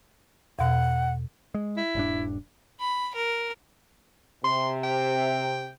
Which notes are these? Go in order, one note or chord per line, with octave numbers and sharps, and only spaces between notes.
E2 B2 F#5
G#3
E4
D#1 G2 D4
B5
A#4
C3 C6
G5